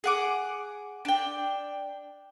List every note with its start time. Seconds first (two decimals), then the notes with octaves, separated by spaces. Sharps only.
0.04 G#4 F#5 D6
1.05 D4 G5